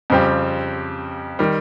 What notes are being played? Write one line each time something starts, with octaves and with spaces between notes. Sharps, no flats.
F2 C#3 G3 C4 G4
D#3 G3